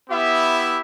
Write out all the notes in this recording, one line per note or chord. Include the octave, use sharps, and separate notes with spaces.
B3 E4 G4 E5